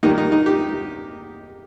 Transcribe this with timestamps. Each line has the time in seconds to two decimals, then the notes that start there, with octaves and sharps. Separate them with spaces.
0.03 D#2 D#3 G3 A#3 D#4
0.18 D#4
0.32 D#4
0.46 G4